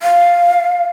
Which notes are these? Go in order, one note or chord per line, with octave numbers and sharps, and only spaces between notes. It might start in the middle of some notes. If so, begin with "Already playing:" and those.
F5